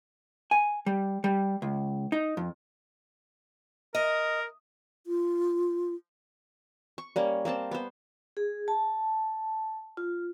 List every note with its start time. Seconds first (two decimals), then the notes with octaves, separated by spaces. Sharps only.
0.51 G#5
0.86 G3
1.24 G3
1.62 C#2
2.12 D#4
2.37 F2
3.95 A#4 D#5
5.07 F4
6.98 C#6
7.16 G3 A#3 C#4
7.45 A#3 C4 C5 A5
7.71 B3 C5
8.37 G#4
8.68 A5
9.97 F4